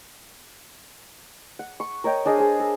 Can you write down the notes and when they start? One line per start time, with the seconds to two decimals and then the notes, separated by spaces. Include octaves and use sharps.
1.59 F#5
1.80 C#6
2.04 A#4 C#5 D#5 G5
2.25 D4 G#4 D#5 F5
2.37 G#4 C5
2.60 A4